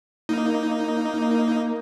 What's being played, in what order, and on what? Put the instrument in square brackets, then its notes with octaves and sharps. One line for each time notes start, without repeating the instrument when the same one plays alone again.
[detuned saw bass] A#3 [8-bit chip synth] D#4